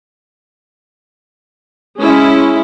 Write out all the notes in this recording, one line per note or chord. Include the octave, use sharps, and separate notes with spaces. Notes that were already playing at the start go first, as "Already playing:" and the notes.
G#3 C#4 E4